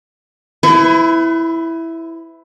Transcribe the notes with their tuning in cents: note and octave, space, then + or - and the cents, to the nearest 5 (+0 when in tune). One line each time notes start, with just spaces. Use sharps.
E4 +0 B4 +40